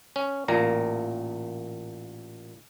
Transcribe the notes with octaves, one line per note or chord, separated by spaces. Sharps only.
C#4
A1 A#2 A#3 A#5